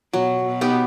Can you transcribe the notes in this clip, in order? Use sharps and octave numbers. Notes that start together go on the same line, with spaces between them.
B2 F#3
B2
B3 D#4 G4